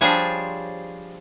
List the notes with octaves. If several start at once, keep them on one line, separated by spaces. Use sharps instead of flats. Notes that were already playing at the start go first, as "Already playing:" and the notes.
F3 G3 D4 G#4 C5 C#5